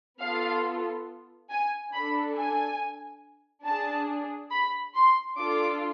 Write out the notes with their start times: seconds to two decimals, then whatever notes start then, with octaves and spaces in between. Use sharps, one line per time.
0.21 B3 F4 A4 F5
1.51 G#5
1.93 D4 A4 B5
2.37 G#5
3.65 D4 G#4 A5
4.51 B5
4.95 C6
5.37 D4 F4 A4 D6